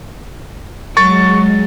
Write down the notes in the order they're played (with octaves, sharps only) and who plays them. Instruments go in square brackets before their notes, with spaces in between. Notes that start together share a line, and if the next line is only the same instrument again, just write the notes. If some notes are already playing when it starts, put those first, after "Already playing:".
[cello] F#3 [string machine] G#3 [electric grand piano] C#6 A6